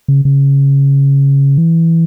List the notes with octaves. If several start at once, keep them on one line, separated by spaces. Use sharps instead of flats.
C#3
C#3
E3